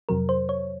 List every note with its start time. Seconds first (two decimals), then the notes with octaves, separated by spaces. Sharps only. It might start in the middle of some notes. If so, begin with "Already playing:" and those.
0.09 F2 C3 F#3 A#4
0.29 C5
0.49 C#5